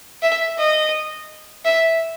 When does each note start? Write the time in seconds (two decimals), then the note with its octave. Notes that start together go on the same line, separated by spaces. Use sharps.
0.22 E5
0.58 D#5
1.65 E5